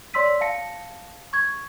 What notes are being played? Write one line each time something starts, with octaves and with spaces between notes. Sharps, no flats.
C#5 D5 C6 E6 B6 D#7
F5 A5 A#6 C#7
C#6 G#6